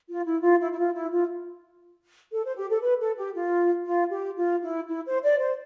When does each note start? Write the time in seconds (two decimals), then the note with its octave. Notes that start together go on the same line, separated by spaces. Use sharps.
0.08 F4
0.25 E4
0.43 F4
0.59 E4
0.71 E4
0.78 F4
0.94 E4
1.12 F4
2.32 A4
2.44 C5
2.57 G4
2.70 A4
2.82 B4
3.00 A4
3.17 G4
3.34 F4
3.85 F4
4.11 G4
4.37 F4
4.63 E4
4.88 E4
5.06 C5
5.23 D5
5.39 C5